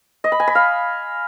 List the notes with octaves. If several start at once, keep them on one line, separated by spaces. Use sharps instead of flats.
D#5
B5
G#5
B5
F5